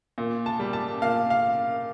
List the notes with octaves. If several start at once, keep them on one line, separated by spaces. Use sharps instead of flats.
A#2
A5
G3
A5
A#2 F5
F5